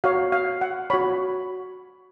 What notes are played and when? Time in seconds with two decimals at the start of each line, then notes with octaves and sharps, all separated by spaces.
0.04 F#4 C#5 F5
0.32 F5
0.61 F#5
0.90 F#4 C#5 B5